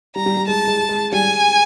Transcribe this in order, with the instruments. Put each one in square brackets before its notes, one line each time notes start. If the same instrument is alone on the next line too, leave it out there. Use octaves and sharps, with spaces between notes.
[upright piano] G3 [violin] A#5
[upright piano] G3
G3
[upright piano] G#3 [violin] A5
[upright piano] G#3
G#3
[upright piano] G3 [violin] G#5